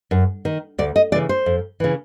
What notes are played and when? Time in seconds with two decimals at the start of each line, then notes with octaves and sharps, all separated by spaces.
0.11 F#2
0.45 D#3
0.78 D2 D5
0.96 D#5
1.12 C#3 E3 D5
1.29 C5
1.46 F2
1.80 C#3 E3